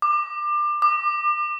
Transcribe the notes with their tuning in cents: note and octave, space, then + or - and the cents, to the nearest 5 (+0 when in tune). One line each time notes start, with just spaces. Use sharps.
D6 +25
D6 +35